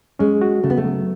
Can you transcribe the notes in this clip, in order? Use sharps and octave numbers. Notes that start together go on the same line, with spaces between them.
G#3 C#4
F#4
C#3 A3
B3
A3
F#3